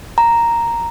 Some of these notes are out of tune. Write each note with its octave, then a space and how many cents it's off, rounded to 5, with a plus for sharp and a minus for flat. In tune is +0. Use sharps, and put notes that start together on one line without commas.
A#5 +0